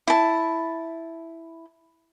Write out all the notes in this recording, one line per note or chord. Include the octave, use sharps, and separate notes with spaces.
E4 A5